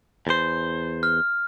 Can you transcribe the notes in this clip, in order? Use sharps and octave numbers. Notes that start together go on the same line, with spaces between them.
E2 C5
F6